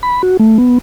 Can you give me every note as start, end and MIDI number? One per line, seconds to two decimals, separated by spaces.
0.03 0.22 83
0.23 0.37 66
0.40 0.58 57
0.58 0.78 59